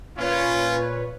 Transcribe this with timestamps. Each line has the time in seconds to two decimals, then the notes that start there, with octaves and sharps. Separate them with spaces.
0.18 A#2 C#4 F4 B4 C#5